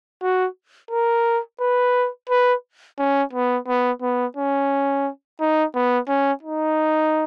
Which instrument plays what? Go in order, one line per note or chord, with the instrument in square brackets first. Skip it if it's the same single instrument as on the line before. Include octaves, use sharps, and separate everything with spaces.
[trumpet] F#4
A#4
B4
B4
C#4
B3
B3
B3
C#4
D#4
B3
C#4
D#4